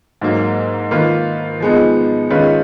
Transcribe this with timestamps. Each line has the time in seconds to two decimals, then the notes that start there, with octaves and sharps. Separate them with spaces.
0.21 G#2 F#3 A#3
0.91 D#3 A#3 F4 B4
1.60 F3 G#3 B3 D#4
2.30 D#3 G#3 C#4 F4 B4